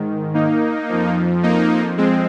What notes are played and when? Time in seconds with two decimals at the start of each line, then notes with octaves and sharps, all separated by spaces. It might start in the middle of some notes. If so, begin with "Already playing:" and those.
Already playing: G#2 D#3
0.34 A#3 D#4
0.89 F2 F3
1.43 A#3 D#4
1.97 G#3 C4